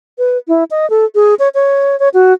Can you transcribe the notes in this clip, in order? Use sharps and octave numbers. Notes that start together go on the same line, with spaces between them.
B4
E4
D#5
A4
G#4
C#5
C#5
C#5
F#4